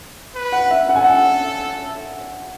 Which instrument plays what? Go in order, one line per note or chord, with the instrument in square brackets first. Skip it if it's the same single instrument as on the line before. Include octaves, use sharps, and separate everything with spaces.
[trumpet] B4
[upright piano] F#5
E5
[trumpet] A4 [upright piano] F#5
[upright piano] G#5
F#5